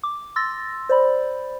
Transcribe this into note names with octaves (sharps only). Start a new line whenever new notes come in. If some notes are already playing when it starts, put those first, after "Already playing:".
D6
C6 E6 A6 A#6
C5 D5 B5